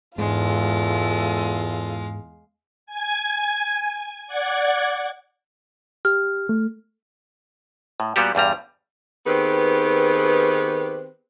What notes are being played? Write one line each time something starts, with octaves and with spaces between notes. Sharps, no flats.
E2 G#2 G#3 F4 A4 F5
G#5 G#6
D5 F#5 G#6
G4 F6
A3
A2
A#2 G3 B3 F#4 G4
E2 G2 G3 A#5
D#3 B3 C4 G4 G#4 B4